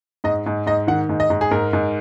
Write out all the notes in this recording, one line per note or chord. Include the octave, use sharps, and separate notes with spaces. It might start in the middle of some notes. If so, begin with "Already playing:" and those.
G#2 D#5
G#2
G#2 D#5
D#3 F#5
G#2
D#5
G#2
G#4
G#2 A#4
G#2